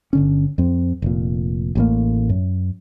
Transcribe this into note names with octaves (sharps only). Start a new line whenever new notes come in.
G1 D3 C#4
F2 C4
F1 A#2
A1 A2 A#3
F#2